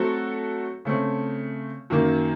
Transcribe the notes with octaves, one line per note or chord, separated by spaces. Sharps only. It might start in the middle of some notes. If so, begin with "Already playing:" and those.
Already playing: F#3 A3 C4 F#4 A4
C#3 A3 C4
F#2 D#3 A#3